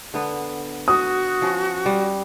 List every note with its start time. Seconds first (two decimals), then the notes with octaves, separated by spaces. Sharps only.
0.14 D3 B3
0.88 F#4 D#6
1.42 F3 C#4
1.86 G3